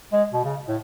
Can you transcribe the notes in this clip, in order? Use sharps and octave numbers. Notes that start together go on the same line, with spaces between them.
G#3
B2
C#3
A2